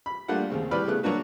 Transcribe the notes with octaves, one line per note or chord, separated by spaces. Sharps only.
B5
G3 A3 A#3 D4 F4 F#5
D#2 C#3 C4
A2 G3 B4 D5 B5 F6
C#3 A3 B3 G#4 F#6
F#3 A#3 D4 F#4 B4